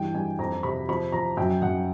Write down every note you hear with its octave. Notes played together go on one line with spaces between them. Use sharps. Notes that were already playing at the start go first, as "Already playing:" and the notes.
Already playing: G2 E3 G5
G2 G#5
F2 A#5
C3 B5
F3 B5
F3 A#5
F#2 G5
F#2 F#5